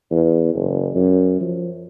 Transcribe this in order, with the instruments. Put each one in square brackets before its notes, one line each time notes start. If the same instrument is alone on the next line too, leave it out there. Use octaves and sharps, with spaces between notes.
[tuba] E2
F#1
F#2
F3